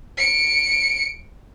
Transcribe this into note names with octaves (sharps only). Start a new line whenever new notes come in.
C#7 D7